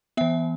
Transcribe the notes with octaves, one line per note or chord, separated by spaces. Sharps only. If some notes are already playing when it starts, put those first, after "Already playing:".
E3 B3 E5